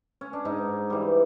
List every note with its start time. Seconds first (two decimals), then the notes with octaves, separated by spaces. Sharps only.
0.21 C#4
0.33 D4
0.45 G#2 D#4
0.90 E3 G3